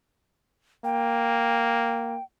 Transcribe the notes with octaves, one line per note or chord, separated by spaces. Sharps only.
A#3 G5